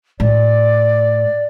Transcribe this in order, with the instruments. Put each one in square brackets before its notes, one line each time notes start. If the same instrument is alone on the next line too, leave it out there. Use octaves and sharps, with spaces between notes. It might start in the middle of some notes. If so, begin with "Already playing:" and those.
[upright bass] A2 [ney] D5